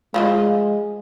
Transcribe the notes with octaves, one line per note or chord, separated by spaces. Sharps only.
F3 G#3 F4 D#5